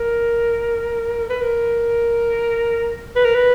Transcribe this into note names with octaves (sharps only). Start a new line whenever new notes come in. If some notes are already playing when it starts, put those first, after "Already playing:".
Already playing: A#4
B4
A#4
B4
A#4
B4